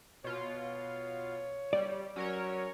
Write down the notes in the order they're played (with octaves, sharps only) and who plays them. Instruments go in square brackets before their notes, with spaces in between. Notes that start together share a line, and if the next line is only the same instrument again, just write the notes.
[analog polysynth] B2 F4 [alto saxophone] C#5
[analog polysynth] G3 [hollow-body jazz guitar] D5
[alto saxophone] F#3 [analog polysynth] C#4 A#4 C#5